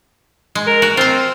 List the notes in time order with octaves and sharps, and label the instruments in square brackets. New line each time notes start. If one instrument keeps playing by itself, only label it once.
[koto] G#3
[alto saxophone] A#4
[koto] F#4
[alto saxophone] C4 [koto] F4 C5